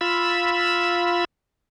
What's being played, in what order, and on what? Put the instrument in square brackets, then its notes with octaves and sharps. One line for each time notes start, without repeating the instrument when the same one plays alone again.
[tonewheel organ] F4 B5 E6